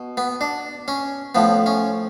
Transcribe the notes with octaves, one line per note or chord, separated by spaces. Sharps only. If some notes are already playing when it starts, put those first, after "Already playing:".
Already playing: B2
B3
D4
C#4
A2 F3 B3
C#4